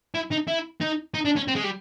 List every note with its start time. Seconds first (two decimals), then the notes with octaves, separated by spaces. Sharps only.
0.15 E4
0.32 D#4
0.48 E4
0.81 D#4
1.14 D#4
1.25 D4
1.36 C#4
1.48 C4
1.55 G#3
1.64 G3